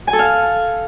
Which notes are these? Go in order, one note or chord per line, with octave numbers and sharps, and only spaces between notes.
G#5
A4
F5